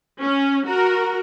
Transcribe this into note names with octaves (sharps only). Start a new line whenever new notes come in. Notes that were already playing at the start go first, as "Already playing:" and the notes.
C#4
F#4 A#4